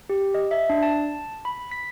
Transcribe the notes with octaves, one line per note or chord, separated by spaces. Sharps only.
G4
D#5
E5
D4
A5
B5
B6